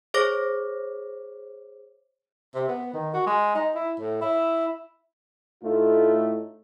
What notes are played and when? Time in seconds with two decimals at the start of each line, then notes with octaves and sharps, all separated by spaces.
0.14 G#4 C5 C#5 D6 A#6
2.55 C3
2.68 B3
2.93 D#3
3.14 F#4
3.26 G#3
3.55 D#4
3.75 E4
4.00 A2
4.21 E4
5.62 A2 A3 D#4 F4